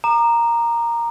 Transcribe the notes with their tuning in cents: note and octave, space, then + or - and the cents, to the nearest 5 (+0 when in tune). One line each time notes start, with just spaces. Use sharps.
A#5 +0 D6 +45